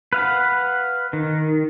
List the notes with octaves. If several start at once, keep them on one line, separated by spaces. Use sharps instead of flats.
B4 F5 F#5
D#3